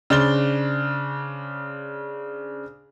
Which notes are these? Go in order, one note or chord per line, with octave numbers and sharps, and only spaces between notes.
C#3 D4 C5 A6 G7